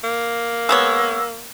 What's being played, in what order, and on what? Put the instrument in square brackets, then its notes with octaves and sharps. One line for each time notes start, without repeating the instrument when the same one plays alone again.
[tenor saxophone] A#3
[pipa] G#3 B3 C#5 [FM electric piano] E6